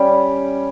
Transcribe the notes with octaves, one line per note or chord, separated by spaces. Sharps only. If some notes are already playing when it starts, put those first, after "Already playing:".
Already playing: G3 C#4 G4